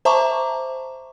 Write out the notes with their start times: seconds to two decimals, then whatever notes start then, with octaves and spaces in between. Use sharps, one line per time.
0.05 C5 E5 A5 A#5 C#6 D6